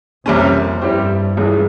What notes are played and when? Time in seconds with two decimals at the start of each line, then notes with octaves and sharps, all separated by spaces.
0.26 C2 F2 C3 G3 A#3 C#4
0.81 G2 G3 C4 E4 G4 C5
1.37 C#2 C#3 E3 G#3